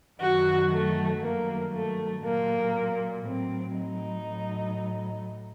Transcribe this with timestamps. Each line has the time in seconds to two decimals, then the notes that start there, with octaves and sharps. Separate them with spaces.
0.20 F#2 D#3 F#3 F#4
0.71 A3
1.22 G2 D#3 F#3 A#3
1.72 A3
2.23 A#2 F#3 A#3
3.25 A2 F#3 C4
3.76 D#4
4.27 A2 F#3